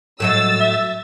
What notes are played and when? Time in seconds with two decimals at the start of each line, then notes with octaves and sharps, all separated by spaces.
0.20 A2 F#3 D#5 E6 A6
0.60 E5